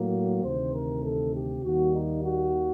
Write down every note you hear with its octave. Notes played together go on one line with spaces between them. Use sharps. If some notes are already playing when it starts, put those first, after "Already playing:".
Already playing: A2 F#3 A#3
D2 C3 D#3 C5
A#4
A4
G4
D#2 D#3 G3 A#3 F#4
D#4
F#4